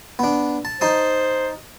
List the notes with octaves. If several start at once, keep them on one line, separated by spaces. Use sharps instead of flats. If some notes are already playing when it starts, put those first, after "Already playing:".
B3 D4
A5
D#4 C5 A5 D#6